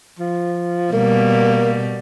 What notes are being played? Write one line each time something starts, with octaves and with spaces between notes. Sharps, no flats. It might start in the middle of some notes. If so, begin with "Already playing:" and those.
F3
B2 G3 A#3